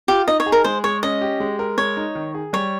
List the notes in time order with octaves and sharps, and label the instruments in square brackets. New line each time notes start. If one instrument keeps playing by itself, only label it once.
[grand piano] F4 [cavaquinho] G4
[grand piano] D#4 [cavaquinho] D#5
[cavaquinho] C#5
[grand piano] G#4
[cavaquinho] A#4
[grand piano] G#3 [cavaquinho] C5
[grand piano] G#3 [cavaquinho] C#5
[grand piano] C#4 [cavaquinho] D#5
[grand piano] G4
G#3
A#4
[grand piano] G#3 [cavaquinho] C#5
[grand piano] D#4
D#3
G#4
[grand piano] G3 [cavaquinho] C#5